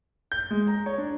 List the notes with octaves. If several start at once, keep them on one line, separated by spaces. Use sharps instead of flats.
G6
G#3
A#5
C#5
D4